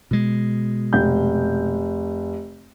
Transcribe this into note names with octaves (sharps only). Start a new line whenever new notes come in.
B2 G#3
F1 G6